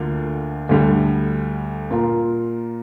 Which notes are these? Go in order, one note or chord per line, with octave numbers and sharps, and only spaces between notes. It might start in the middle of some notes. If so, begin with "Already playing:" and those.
Already playing: D2 D3 A#3 D4 F4
D2 D3 G3
A#2 A#3 F4 A#4